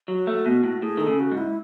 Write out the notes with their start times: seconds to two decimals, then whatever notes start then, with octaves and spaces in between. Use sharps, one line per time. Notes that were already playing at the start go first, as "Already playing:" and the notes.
0.08 F#3 F#4
0.27 A3
0.46 B2
0.64 A2
0.82 A2 G#4
0.97 D#3 A4
1.07 C#3
1.20 F#4
1.32 G#2
1.37 E4